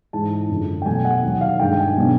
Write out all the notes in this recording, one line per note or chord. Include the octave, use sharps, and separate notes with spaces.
G#2 E3 G#3 A5
F#2 D3 F3
G5
B2 F#3 A3 G#5
F#5
D#2 D#3 F#3
F5
G2 D#3 G#3 G5
G#5
B2 F#3 B3 D4